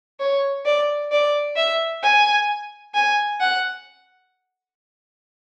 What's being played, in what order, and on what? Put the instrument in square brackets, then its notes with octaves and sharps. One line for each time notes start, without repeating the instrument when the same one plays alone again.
[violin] C#5
D5
D5
E5
G#5
G#5
F#5